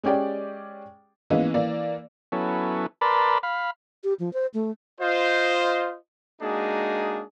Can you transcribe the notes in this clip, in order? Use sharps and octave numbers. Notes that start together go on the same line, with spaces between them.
G#3 C#4 G4 D5 G5
E3 G#3 A#3 B3 C#4 D#4
E3 A#3 D5
F#3 B3 C#4 E4 A4
A#4 B4 D5 A5 B5 C6
F5 B5
G4
F3
C5
A3
F4 C5 D#5
G#3 A#3 D4 D#4 F#4 G#4